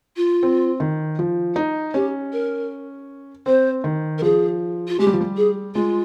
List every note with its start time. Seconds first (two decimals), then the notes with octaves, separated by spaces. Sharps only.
0.16 F4
0.43 C4
0.80 D#3
1.19 F3
1.56 D#4
1.94 C#4 G4
2.32 A#4
3.46 C4 C5
3.84 D#3
4.18 A#4
4.22 F3 G#4
4.88 F4
4.99 G#3 G4
5.07 G3
5.13 F3
5.21 G3
5.37 G#4
5.75 G#3 F4